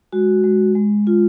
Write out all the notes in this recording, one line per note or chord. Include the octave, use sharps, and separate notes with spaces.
G#3 F#4
G#3
G#3
F4